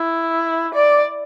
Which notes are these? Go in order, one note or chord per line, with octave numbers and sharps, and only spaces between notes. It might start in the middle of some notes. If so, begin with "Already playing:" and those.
Already playing: E4
D5